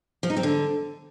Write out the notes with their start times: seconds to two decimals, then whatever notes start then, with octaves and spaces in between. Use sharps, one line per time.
0.23 F3
0.30 D#4
0.37 C4
0.43 D3